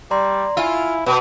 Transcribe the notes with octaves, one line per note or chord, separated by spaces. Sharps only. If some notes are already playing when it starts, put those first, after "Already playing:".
G3 D5 A#5 C6
E4 F4 G#5 E6
B2 B4